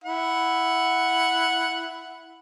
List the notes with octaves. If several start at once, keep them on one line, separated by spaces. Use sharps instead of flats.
E4 F#5